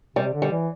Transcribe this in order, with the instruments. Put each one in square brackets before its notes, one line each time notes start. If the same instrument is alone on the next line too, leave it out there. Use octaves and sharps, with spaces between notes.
[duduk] C3 [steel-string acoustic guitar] G3
[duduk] D3
[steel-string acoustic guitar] G3
[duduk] E3